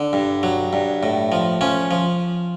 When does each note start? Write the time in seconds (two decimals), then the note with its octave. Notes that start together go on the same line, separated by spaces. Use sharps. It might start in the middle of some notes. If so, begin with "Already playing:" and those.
Already playing: D3
0.13 G2
0.43 F#3
0.73 G2
1.03 A2
1.32 F3
1.61 F3 C#4
1.91 F3